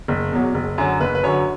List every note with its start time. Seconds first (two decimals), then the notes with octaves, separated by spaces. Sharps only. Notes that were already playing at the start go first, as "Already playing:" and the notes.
0.08 F#1
0.32 E2 B2 F#3
0.54 F#1
0.78 F#2 D3 F#3
1.00 F#1 B4
1.15 B4
1.23 F#2 D3 F#3 C#5